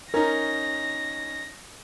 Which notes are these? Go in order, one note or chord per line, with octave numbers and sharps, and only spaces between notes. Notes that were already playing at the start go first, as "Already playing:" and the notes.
C#4 D#4 A#4 A#6